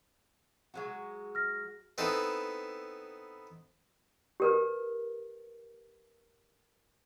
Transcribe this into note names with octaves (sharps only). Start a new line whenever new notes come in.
F#3 G#3 F#4
F6 A#6
B3 C4 D#4 E4 A4
G4 A#4 B4